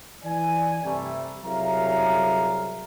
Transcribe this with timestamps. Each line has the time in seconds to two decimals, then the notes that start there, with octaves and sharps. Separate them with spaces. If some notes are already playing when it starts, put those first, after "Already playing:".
0.24 E3 D5 G#5
0.84 G2 C3 G3 A3
1.45 C2 F#3 G#4 E5 F5 A#5